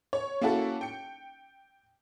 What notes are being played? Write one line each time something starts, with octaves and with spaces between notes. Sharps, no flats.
C#5
A#3 C#4 E4 F#4 A4
G5 C#7